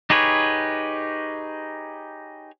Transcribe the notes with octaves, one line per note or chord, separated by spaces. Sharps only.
D#4 G4 G#4 B4 C#5